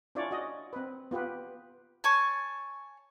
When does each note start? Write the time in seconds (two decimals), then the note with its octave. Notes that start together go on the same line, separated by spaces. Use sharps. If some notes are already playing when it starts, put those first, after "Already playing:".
0.15 C#4 D4 E4 F4 C#5 D5
0.31 F#4 D#5
0.73 C4 B4
1.11 B3 F4 G4 B4
2.04 C#5 G#5 A5